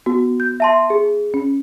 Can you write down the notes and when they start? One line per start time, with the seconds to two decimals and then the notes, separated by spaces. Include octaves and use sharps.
0.06 B3 F#4
0.40 G6
0.60 E5 A5 C6
0.90 G#4
1.34 C#4